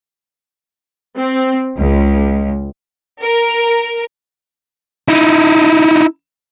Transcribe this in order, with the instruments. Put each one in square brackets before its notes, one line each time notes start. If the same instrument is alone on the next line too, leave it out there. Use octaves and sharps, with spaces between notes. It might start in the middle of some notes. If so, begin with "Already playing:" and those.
[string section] C4
C#2
A#4
[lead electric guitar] D#4 E4